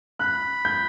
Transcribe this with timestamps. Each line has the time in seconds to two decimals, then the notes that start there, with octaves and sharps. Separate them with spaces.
0.19 B5 F#6
0.65 G6